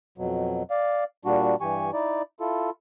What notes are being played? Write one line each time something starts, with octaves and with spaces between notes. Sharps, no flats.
F2 B2 F#3
D5 F5
A#2 G3 D4 F#4
G2 E3 G4 G#5 C#6
D#4 E4 D5
E4 F4 A4